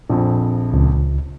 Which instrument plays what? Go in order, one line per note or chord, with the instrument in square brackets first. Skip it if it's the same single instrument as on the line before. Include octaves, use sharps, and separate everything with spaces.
[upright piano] A#1 F2
[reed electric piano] C#2